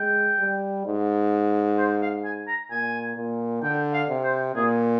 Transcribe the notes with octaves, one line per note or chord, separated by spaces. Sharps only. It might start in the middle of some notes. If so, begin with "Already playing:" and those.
Already playing: G#3 G5
G3
G#2
C5
F5
G#5
A#5
A#2 G#5
A#2
D3 G5
F5
C3
C5
A#2 G#4